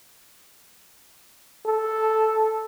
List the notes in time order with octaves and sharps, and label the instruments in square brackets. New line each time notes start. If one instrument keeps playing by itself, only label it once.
[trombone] A4